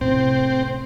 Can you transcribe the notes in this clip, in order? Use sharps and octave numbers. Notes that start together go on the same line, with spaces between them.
A2 C3 C4